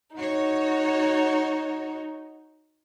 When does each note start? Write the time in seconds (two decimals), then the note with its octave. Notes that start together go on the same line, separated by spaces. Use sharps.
0.16 D#4 F#4 C#5